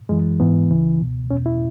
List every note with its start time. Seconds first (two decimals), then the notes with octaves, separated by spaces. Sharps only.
0.09 F#2 E3 G#3
0.40 G#2 E3 B3
0.70 C#2 C#3 E3
1.01 C#2 B2
1.31 E2 B2 C#4
1.46 E4